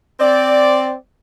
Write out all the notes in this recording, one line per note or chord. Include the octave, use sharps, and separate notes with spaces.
C4 D5